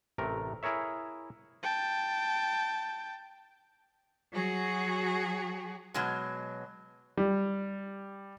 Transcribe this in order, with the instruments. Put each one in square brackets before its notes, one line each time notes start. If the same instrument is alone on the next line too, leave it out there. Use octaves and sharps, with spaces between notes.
[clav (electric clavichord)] A1 C3 A3 A#4
E4 G#4 A#4 C#5 E5
[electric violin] G5 A5
[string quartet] F#3 F#4 G#4
[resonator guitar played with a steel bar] B2 F#3 G#3
[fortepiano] G3